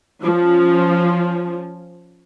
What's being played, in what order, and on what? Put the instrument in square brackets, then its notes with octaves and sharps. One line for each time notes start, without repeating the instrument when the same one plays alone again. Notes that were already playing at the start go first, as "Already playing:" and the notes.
[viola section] F3 C#4